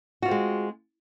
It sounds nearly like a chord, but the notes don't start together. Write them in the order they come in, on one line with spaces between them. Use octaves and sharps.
F#4 F4 C4 G#3